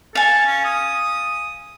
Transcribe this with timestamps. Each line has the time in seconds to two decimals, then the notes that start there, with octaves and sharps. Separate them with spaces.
0.15 A4 F5 G#5
0.46 C#4
0.65 D#6